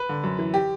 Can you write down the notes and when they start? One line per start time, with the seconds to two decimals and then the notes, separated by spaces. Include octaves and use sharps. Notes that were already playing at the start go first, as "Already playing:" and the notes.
Already playing: B4
0.09 D3
0.24 F#2
0.39 E3
0.54 G4